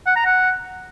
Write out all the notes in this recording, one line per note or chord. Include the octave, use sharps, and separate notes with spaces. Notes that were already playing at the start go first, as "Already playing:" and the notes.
F#5
A#5
F#5